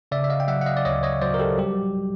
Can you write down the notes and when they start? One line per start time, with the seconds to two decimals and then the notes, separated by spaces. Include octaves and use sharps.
0.12 C#3 D5 E5
0.24 E5
0.30 D#5 F5
0.40 G5
0.48 F#3 E5 F#5
0.61 F#5
0.66 D#5 F5
0.76 D5
0.85 D2 C#5 D#5
1.03 C#5 D#5
1.22 F#3 C5 D5
1.34 A#4
1.40 G4 A4
1.58 G3 G4